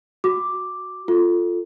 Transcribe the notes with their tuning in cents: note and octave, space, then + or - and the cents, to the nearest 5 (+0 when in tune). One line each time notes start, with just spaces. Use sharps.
F#4 +0 D6 +0
F4 +0 A4 +0